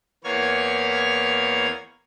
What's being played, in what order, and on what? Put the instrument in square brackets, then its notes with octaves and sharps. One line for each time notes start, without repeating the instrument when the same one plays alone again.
[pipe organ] E2 A#3 B3 C#5 F6 G#6